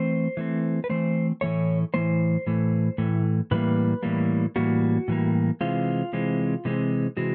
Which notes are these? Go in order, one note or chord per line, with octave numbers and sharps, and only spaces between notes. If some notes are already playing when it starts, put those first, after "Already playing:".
Already playing: E3 A3 C4 C5
E3 A3 C4
B4
E3 A3 C4 C5
A2 E3 A3 C#5
A2 E3 A3 C5
A2 E3 A3
A2 E3 A3
A2 E3 G3 A#3 B4
A2 E3 G3 A#3
A2 E3 G3 A#3 F#4
A2 E3 G3 A#3
C3 E3 G#3 C4 F4
C3 E3 G#3 C4
C3 E3 G#3 C4
C3 E3 G#3 C4 F#4